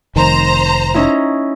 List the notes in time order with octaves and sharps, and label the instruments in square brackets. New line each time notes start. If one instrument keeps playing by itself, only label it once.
[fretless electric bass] F1 D#3 [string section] C5 A#5
[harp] C#4 D#4 E4